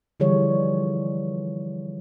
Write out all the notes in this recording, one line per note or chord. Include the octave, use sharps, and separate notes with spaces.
D3 E3 F3 G3 G#4 C#5